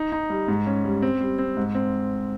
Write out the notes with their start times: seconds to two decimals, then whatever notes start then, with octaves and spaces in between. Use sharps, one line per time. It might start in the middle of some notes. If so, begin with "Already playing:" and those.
Already playing: D#4
0.12 D#4
0.30 G3
0.48 G#2
0.67 C#4
0.85 G3
1.02 C4
1.21 G3
1.39 C4
1.57 G#2
1.75 C4